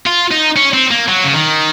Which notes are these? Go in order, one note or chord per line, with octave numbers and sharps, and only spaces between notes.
F4
D#4
C#4
C4
A#3
F#3
C#3
D#3